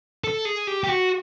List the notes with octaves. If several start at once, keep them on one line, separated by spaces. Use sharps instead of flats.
A4
G#4
G4
G4
F#4